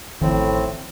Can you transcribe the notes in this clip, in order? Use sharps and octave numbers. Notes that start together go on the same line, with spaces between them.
A1 A2 D#3 F3 C4